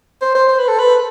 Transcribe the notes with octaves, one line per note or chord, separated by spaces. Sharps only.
C5
C5
C5
B4
A4
B4